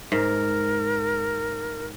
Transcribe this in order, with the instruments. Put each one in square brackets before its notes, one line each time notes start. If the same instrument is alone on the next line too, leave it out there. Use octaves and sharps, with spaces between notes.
[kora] G#2 [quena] A#4